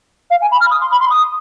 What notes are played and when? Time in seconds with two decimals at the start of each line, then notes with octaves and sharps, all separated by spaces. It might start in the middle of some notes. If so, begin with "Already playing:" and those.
0.30 F5
0.41 G#5
0.51 B5
0.60 F6
0.71 D#6
0.81 C6
0.91 B5
1.00 C6
1.10 D#6